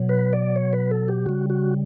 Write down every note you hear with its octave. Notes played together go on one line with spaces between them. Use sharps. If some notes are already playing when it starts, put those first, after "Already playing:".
Already playing: B2 F#3
B4
D5
C#5
B4
A4
G4
C#3 G3 F#4
F#4